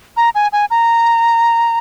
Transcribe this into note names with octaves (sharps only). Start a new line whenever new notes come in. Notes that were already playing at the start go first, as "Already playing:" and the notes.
A#5
G#5
G#5
A#5